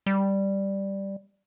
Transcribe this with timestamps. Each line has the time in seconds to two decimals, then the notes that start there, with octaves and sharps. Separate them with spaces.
0.06 G3